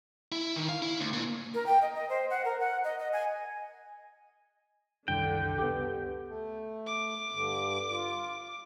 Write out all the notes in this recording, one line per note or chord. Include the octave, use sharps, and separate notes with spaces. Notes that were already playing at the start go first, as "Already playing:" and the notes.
E4
D#3
F5
E4
D2
A#2
A#4
G5
D#5
D#5
C5
F#5
A#4
F#5
D#5
D#5
G#5
C2 F#2 D3 D#3 D4 G5
C#2 B3 G4
A3
D6
G2 D3
F4